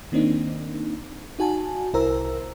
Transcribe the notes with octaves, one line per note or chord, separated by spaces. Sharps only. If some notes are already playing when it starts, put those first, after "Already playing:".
D#3 A#3 C4 D4 D#4
D#4 F#4 G#5 A5
C2 E4 A#4 C5 A#5 E6